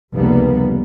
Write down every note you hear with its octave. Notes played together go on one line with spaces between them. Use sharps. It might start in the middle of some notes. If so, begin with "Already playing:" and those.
F1 C#2 G3 G#3 A#3 B3